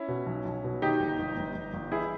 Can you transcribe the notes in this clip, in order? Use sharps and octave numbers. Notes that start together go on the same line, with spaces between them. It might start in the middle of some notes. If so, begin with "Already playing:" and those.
Already playing: C#4 E4
B2
B1
B1
B2
D#3 D#4 G4
G1
G1
G1
G1
G1
E3 E4 G#4